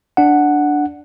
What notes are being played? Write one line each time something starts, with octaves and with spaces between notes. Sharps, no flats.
D4 F#5